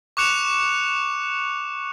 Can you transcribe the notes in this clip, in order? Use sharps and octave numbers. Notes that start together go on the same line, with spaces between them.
C#6 D6 F#6 C#7 E7 F7